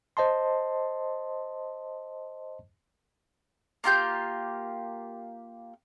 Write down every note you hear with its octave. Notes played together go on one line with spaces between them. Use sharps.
C5 D#5 A5 C6
A#3 F4 G4 G6